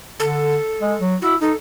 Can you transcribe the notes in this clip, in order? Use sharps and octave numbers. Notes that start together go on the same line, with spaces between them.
D3 A4
G#3
F#3
E4 F#4
D#4 A4